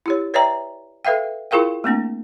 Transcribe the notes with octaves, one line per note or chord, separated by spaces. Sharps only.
E4 G4 C#5
B4 C#5 D5 E5 G5 A#5
A4 B4 E5 F5 G5
E4 F4 G#4 A#4 F5 G5
A3 A#3 C4 D4